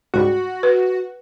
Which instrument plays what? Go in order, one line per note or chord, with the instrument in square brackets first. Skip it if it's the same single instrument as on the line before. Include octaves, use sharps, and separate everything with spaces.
[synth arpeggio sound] C#2 G#2 G3 [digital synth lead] F#4
[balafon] B4